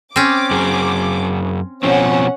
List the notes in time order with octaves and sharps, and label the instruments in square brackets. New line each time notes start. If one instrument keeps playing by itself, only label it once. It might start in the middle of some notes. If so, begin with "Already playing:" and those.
[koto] C4 C#4 [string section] D6
[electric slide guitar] F#2 G#4
[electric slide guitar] B2 F3 C4 [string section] C#4 F#5